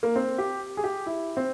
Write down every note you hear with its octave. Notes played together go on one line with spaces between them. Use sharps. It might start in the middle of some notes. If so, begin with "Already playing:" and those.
A#3
C4
G4
G#4
G4
E4
C4